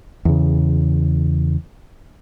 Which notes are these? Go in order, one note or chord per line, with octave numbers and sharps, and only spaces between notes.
E2 C#3